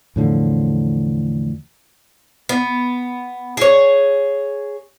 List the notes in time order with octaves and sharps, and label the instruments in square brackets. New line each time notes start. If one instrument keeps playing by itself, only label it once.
[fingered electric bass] E2 A2 D3 F3
[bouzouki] B3
G#4 C#5